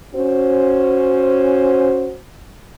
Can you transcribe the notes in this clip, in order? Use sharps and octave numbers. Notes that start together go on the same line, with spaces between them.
C#4 F#4 C5